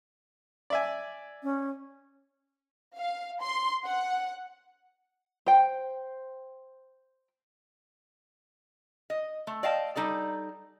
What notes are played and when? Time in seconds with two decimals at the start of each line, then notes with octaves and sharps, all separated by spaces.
0.70 D5 E5 G#5
1.43 C#4
2.96 F5
3.41 C6
3.85 F#5
5.46 C5 G5
9.10 D#5
9.47 A3
9.63 D5 D#5 F5 G5 A5
9.96 G3 D#4 A4 D5